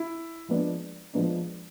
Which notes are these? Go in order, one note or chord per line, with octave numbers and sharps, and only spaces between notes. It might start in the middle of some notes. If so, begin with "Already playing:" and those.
Already playing: E4
F3 G#3 B3 D4
F3 G#3 B3 D4